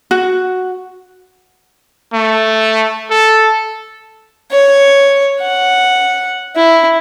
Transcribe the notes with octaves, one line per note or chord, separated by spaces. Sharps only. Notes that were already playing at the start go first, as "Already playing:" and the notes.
F#4
A3
A4
C#5
F#5
E4